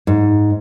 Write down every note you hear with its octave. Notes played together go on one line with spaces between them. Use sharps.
G#2